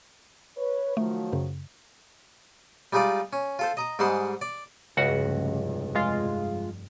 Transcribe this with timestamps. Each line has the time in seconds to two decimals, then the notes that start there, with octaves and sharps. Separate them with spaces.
0.57 B4 C#5
0.97 D#3 F3 F#3 A3
1.33 F#2 C#3
2.93 G3 G#3 D#4 F4 D5
3.33 C#4
3.59 F4 A4 C5
3.77 D#5 A#5 D#6
3.99 G#2 G3 G#3 C5 F#5 C6
4.41 D5
4.97 F1 C#2 G2 C#3 F#4 F#5
5.95 G#3 F4